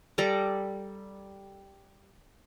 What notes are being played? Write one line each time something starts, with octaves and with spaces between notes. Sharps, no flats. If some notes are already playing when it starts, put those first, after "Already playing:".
G3 A4 D5 A#5